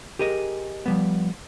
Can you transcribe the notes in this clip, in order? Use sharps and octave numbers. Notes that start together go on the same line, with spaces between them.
G4 G#4 A#4 D#5
F3 G3 B3